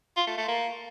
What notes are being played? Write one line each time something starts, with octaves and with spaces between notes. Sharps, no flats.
F4
A3
A3
A#3